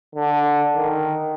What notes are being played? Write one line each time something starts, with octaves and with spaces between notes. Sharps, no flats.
D3
D#3